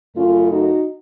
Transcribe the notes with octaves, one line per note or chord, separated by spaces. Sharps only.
F#2 C#3 A3 C#4 F4
D#4 F#4